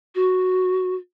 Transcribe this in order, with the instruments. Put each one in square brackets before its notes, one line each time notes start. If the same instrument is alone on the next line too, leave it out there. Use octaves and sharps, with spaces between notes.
[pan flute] F#4